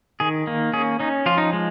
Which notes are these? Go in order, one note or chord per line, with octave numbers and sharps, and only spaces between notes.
D#3 G#4
A#3
C#4 G#4
C#4 D#4
F3 F4
D#4
G#3